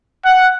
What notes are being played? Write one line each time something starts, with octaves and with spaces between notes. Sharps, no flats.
F#5